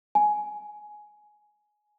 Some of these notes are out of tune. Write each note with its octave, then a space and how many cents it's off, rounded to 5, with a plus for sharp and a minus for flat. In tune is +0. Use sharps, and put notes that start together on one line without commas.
G#5 +10